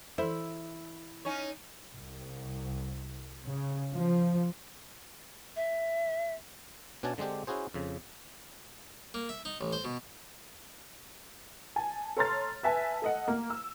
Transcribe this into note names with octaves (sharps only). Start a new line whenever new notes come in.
E3 E4 A4 C5 E5
C#4 D#4 C#5
C2
C#3
F3
E5
B2 C#4 D4 F#4 G#5 A5
D3 G#3 C4 D4 G4
C#4 E4 F#4 G#4 C5
F2 C#3
A#3
E5
D#4
A1
C5
B2
G#5 A5
A4 C#5 A#5 C6 F6 A6
B4 E5 G#5 A5
A4 D#5 F#5
A#3
E6